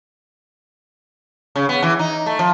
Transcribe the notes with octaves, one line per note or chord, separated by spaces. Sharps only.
C#3
B3
E3
D#4
A3
F3